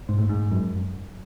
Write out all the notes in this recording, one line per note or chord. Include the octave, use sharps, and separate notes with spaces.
G#2
A2
G#2
F#2